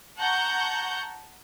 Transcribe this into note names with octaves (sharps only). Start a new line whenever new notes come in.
F#5 A5 A#5 C#6 G6